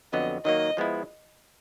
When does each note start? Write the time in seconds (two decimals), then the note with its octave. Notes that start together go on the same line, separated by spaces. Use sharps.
0.13 F2 D3 F#3 B3 D#5
0.45 D#3 F#3 A#3 D#5
0.77 F3 G#3 B3 E4